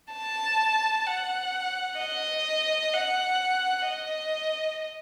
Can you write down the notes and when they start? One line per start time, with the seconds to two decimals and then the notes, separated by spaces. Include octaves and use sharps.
0.13 A5
1.07 F#5
1.99 D#5
2.93 F#5
3.87 D#5